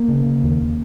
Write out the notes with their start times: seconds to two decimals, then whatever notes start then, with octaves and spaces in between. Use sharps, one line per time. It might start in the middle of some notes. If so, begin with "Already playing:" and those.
Already playing: A#3
0.09 C#3
0.26 C#3
0.43 D#2